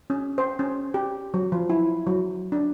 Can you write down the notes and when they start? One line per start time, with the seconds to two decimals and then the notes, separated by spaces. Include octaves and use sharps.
0.10 C#4
0.38 C5
0.59 C#4
0.94 G4
1.34 F#3
1.52 F3
1.70 E4
2.07 F#3
2.52 D4